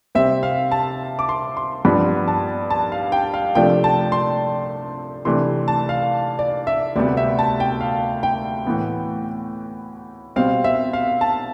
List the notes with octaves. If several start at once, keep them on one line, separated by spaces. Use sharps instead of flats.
C3 G3 C4 E5
F5
A5
D6
C6
C6
G2 F3 B3 D4 B5
A5
A5
F5
G5
F5
C3 F3 A3 D4 G5
A5
C6
C3 E3 A3 D4 C6
A5
F5
D5
E5
D2 C3 G3 B3 D5
E5
A5
G5
F5
G5
A2 E3 B3
B2 G3 C4 F5
E5
F5
A5